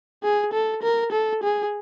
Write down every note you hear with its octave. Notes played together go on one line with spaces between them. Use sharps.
G#4
A4
A#4
A4
G#4